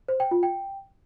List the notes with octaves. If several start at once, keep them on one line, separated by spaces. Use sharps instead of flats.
C5
G5
F4
G5